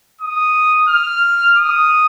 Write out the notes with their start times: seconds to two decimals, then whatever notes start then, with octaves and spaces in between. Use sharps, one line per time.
0.21 D#6
0.89 F6
1.58 D#6